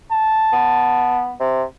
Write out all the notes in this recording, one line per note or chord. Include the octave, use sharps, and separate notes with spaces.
A5
B3
C3